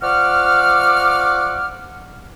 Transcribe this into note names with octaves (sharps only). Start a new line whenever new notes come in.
F3 D5 F#5 C#6 D6 F6